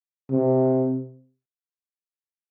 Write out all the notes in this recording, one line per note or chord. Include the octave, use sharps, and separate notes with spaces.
C3